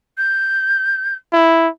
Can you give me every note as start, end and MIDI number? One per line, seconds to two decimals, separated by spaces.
0.18 1.15 91
1.33 1.68 64